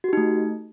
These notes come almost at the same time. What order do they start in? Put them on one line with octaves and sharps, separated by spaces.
F#4 G4 D#4 A3